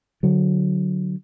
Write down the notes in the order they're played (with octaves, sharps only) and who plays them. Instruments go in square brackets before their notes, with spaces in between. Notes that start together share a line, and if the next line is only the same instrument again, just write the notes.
[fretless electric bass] D3 F#3